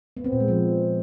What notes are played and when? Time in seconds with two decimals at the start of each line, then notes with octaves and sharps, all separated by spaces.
0.17 B3
0.24 C4
0.32 A#2
0.40 G#3
0.48 F3